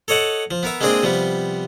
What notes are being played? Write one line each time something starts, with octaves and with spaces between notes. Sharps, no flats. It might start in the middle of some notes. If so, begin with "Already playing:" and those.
A4 C#5 D#5 F#5 A5
F3
B3 A#4 E5
G#3 A#3 C4 D4 G#4 D#5
C3 F3 G3 B3